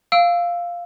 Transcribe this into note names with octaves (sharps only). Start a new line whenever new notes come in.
F5 E6 D7